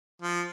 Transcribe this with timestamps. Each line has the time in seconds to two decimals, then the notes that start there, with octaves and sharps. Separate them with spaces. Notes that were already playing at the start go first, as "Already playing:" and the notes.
0.22 F3